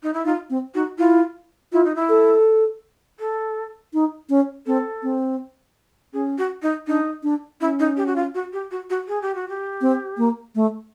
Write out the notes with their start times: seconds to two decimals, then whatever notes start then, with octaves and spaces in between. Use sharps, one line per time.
0.03 D#4
0.14 E4
0.25 D#4 F4
0.50 C4
0.74 D#4 F#4
0.98 E4 F4
1.72 E4 F4
1.84 D#4
1.95 E4
2.09 A4
3.20 A4
3.94 D#4
4.30 C#4
4.66 C4 A4
5.03 C4
6.13 C#4 G#4
6.38 F#4
6.62 D#4
6.87 D4 D#4
7.23 D4
7.61 C#4 E4
7.79 D#4
7.97 G4
8.06 F#4
8.16 F4
8.34 F#4
8.53 G4
8.71 F#4
8.90 F#4
9.08 G#4
9.22 G4
9.35 F#4
9.49 G4
9.81 C4
10.18 A#3
10.55 A3